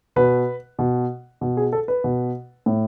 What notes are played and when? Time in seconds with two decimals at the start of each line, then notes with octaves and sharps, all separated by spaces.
0.16 B2 B4
0.79 B2
1.41 B2
1.57 G#4
1.73 A4
1.88 B4
2.04 B2
2.66 A2